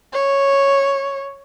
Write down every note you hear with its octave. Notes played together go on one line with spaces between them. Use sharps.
C#5